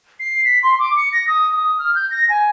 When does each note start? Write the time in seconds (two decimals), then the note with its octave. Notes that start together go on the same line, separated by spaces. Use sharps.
0.19 C7
0.44 B6
0.63 C6
0.79 D6
0.97 C#7
1.13 A#6
1.28 D#6
1.57 D#6
1.79 F6
1.95 G6
2.11 A#6
2.29 G#5